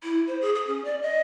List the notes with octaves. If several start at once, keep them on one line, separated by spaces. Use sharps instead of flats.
E4
C5
G#4
G#4
C#4
D5
D#5